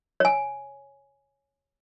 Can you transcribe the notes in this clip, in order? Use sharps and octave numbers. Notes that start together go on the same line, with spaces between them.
C#5 G#5